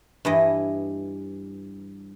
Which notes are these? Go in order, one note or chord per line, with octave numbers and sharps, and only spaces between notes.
G2 E3 D#5